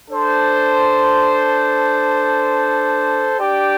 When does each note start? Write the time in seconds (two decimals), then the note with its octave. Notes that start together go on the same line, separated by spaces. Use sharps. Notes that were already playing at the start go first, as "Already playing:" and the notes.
0.10 D4 A4 C5
3.38 D4 G4 D5 G5